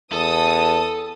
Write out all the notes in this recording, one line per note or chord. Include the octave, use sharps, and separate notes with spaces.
E2 A4 A5 D#6